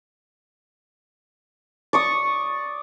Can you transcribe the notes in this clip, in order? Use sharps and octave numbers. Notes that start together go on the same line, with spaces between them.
D5 C#6 D#6